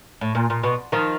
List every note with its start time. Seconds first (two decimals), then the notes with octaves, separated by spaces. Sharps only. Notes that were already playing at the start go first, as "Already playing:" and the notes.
0.21 A2
0.35 A#2
0.50 A#2
0.63 B2
0.92 D#3 F3